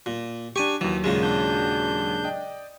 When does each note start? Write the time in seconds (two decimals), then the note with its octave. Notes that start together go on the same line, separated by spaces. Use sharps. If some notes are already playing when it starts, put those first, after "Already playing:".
0.06 A#2
0.56 D4 G4 G#5 C#6
0.81 D#2 E3 F#3
1.04 A#2 C#3 G#3
1.22 D4 G6
2.24 D5 D#5 G5